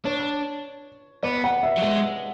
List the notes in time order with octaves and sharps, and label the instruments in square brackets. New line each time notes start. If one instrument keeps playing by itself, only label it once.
[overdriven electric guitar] D4 [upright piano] C#5
[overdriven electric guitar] B3 [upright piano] D5
[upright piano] F#5
E5
[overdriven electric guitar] F#3
[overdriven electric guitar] G#3 [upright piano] E5